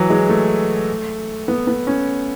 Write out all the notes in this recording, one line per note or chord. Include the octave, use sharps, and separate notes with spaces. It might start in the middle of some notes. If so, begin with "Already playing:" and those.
Already playing: E3 F#3
G#3
A3
B3
B3
C#4